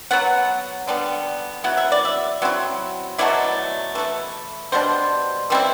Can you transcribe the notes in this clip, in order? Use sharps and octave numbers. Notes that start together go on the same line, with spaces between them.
F#3 B3 F#5
D3 G3 B3
F#3 B3 E4 F#5
E5
D5
E5
F#3 C4 E4
B2 F#3 A3 E4 D5
E3 A3 E4
B2 G3 D4 C5
E3 G3 C4 E4